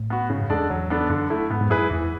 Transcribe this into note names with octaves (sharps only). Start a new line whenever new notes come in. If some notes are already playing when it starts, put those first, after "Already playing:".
Already playing: A2
B3 F#4
G#2 C#3
F#2
E2 G#3 D4 A4 D5
E2 F#3
B3 D4 A4
F#2 D3
A3 E4
G#2 B3
G#2
F#2 E4 G#4 B4
E2 E3